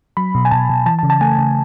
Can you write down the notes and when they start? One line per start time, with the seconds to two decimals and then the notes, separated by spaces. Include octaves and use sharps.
0.17 F#3 B5
0.35 B2
0.45 G#5
0.51 B2 A5
0.70 B2
0.86 E3 A5
0.99 A5
1.03 C#3
1.10 A5
1.21 A3 G#5
1.39 C#3